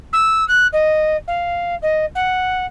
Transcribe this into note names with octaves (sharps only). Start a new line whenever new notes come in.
E6
F#6
D#5
F5
D#5
F#5